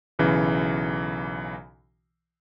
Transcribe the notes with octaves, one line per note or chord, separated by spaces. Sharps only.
B1 C#3 E3